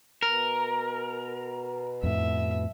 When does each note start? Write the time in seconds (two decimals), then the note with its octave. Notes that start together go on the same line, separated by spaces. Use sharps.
0.23 B2 A#4
2.03 F2 A2 E5